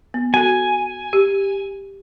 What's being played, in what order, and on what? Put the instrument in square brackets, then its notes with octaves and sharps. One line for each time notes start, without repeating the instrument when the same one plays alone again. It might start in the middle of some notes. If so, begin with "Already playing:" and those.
[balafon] B3
[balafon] F#4 A4 [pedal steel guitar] G#5
[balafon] G4